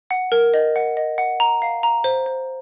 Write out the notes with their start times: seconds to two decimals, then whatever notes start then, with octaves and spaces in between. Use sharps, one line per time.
0.11 F#5
0.32 A#4
0.54 D#5
0.76 F#5
0.97 D#5
1.18 F#5
1.40 A#5
1.62 F5
1.83 A#5
2.04 C5
2.26 C5